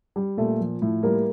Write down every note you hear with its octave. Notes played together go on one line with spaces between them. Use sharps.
G3
A#2 A3 A4
F3
A2
G3 A#3 A#4